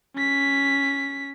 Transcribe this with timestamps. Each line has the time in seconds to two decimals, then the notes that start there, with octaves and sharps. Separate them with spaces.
0.16 C#4 B6